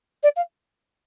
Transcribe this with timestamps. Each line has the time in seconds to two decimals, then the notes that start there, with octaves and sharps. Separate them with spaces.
0.23 D5
0.36 F5